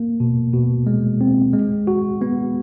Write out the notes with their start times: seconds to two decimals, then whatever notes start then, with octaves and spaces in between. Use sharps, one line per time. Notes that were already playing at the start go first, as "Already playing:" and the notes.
Already playing: A#3
0.20 B2
0.54 B2
0.87 G#3
1.21 C4
1.53 G#3
1.87 F#4
2.21 B3